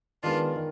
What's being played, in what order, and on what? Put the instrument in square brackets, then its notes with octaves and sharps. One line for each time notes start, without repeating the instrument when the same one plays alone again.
[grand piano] D#3 G#3 B3 [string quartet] D4 F4
[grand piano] D#3